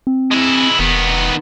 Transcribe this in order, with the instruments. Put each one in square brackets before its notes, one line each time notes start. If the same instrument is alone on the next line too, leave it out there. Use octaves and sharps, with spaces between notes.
[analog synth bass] C4
[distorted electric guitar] G#3 E4
[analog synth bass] E1 [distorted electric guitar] D#3 B3